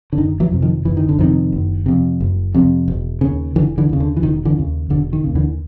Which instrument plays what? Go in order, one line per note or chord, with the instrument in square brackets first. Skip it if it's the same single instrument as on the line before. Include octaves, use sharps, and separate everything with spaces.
[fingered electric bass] D3
F#1 D#3
E3 F#3
F2 C3
D#3 F3
F#1 E3
D#3
D3
F2 C3 D#3
F#1
F2 C3
F#1
F2 C3
E1
D#2 C#3
E1 D3 E3
D3 E3
D#2 C#3
D3
E3
E1 D#3
D3 E3
D#2 C#3
E1 D3
D#3
D#2 C#3
D3 E3